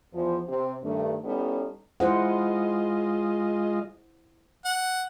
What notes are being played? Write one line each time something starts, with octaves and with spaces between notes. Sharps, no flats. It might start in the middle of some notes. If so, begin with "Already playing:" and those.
E2 F3 C5
C3 C4
G2 D#3 A3
G3 B3 C#4 D#4 E4 A4
G#3 E4 F4 C5 D#5 F#5
F#5